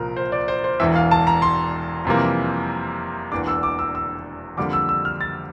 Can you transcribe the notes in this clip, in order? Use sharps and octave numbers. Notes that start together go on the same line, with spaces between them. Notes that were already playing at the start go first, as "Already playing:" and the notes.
Already playing: C2 A#2 F3 A#4
C5
D5
C5
C5
E1 E2 E3 E5
F5
A5
A#5
C6
F2 C3 E3 G3 A#3
E1 E2 E3 A#3 D4 D6
E6
D6
E6
E6
F2 D3 G3 A#3 D4 D6
E6
E6
F6
A6